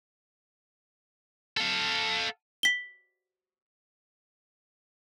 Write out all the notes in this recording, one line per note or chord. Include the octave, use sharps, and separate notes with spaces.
A4 F5
B6 G7